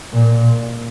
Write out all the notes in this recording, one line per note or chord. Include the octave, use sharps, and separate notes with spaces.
A#2